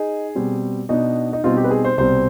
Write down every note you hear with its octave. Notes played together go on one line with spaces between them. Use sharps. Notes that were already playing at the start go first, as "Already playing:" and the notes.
Already playing: D#4 G#4
B2 G3 C4
B2 B3 D4 D#4
D#4
B2 G3 C4 D#4 F4
G4
B4
G#4
C5
C2 B2 G3 C4 C5